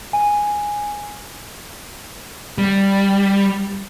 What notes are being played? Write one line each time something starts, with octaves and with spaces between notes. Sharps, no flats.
G#5
G3